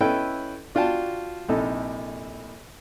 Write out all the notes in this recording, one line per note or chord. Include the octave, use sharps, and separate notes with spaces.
C#4 E4 A4 B4 D#5 G5
D4 F4 F#4 G5 A5
A#1 C3 D#4 E4 A4